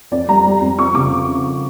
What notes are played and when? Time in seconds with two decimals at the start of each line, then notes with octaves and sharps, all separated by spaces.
0.11 F2 D5
0.28 G3 A#5
0.45 G3
0.61 F2
0.78 F2 C#6
0.95 C#3 D6